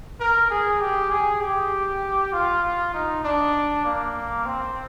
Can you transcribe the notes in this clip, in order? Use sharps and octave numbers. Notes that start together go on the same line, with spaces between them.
A#4
G#4
G4
G#4
G4
F4
D#4
D4
A#3
C4